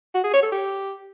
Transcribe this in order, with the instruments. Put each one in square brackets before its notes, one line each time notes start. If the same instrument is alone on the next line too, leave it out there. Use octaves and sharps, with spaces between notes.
[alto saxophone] F#4
G#4
C#5
A4
G4